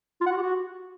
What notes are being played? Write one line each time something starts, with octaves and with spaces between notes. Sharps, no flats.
F4
F#5
F#4
G4
F#4